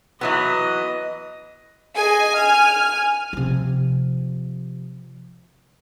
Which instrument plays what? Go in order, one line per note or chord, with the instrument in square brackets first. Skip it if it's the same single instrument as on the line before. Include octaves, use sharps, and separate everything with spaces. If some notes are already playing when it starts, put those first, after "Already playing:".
[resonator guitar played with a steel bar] E3 F#3 B3 [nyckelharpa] D#5
[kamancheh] G#4 D#5 [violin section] G#5
[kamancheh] F6
[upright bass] C3 F3